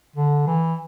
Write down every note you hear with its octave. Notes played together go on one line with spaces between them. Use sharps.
D3
E3